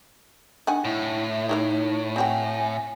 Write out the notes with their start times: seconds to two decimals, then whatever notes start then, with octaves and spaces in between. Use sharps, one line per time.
0.67 D#3 D4 F#5 G#5
0.85 A2 E4
1.30 E5
1.49 D#4 E4 A#4 F5
2.16 C4 F#4 G5 G#5